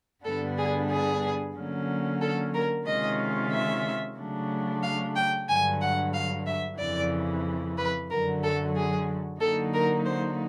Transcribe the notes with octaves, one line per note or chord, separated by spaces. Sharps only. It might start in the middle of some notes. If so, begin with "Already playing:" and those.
G2 D3 G3 B3 D4 A4
G#4
G#4
D3 F#3 A#3 C#4
A4
A#4
C3 D#3 G#3 C#4 F4 D#5
E5
C#3 F#3 A3 D4
F5
G5
G2 D3 F#3 G#5
F#5
F5
E5
F2 C#3 E3 D5
B4
F#2 D3 F#3 A#4
A4
G#4
D3 F#3 A#3 D#4 A4
A#4
C5